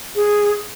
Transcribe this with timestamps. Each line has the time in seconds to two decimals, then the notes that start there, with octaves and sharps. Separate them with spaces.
0.15 G#4